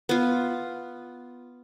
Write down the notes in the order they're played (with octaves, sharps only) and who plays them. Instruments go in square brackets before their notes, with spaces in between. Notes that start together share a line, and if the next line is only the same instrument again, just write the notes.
[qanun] B3 F4